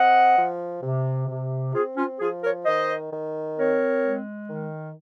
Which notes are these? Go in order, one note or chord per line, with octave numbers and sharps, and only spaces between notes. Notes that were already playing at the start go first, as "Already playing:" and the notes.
Already playing: C4 D#5 F#5
F3
C3
C3
C4 F4 G#4
C#4 F4
F3 F4 G#4
A#4 C#5
D#3 C5 D#5
D#3
C4 A#4 C#5
G#3
D#3